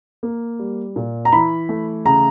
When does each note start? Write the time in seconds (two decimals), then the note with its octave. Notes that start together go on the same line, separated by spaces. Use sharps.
0.23 A#3
0.59 G3
0.96 A#2
1.25 A#5
1.32 E3 B5
1.69 A3
2.05 C#3 A#5